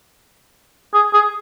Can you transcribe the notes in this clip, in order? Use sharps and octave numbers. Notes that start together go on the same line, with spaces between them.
G#4
G#4